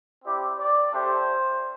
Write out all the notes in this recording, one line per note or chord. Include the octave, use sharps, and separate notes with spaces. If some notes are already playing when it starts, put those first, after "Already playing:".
C4 E4 G4 D5
D5
A3 D4 G4 C5